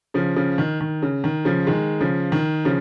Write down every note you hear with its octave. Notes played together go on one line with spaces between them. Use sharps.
C#3 F3
C#3 F3
D#3
D#3
C#3
D#3
C#3 F3
D#3 G#3
C#3 F3
D#3
C#3 F3